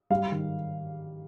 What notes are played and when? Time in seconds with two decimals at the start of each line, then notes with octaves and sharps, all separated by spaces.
0.10 G3 F5
0.32 D#3